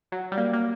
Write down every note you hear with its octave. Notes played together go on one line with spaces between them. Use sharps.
F#3
G3
A#3
A#3